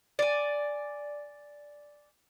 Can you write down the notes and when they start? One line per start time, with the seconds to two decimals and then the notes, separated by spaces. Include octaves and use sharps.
0.19 D5 G#5